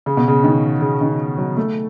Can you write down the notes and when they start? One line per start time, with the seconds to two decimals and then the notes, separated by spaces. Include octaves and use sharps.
0.06 C#3
0.17 B2
0.28 C#3
0.44 D#3
0.81 C#3
1.01 D#3
1.38 F#3
1.57 A3